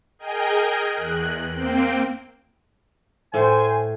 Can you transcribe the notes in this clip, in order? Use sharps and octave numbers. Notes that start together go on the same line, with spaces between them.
G#4 A#4 D#5 G5 G#5
E2 F#6
A#3 C4 G5
A2 C5 G#5